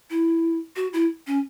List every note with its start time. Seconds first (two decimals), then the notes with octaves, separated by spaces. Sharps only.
0.10 E4
0.76 F#4
0.93 E4
1.27 C#4